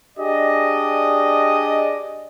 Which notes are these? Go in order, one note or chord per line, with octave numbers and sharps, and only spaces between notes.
D4 G4 G#4 D5 D#5